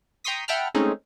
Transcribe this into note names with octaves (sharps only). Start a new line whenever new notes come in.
G5 A#5 C6 C#6 D#6 B6
E5 F#5 G5 A5 B5 F6
G#3 A3 C4 C#4 D#4 G#4